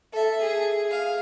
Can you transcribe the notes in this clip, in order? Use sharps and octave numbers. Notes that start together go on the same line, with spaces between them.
A4 E5
G#4
G#4 F5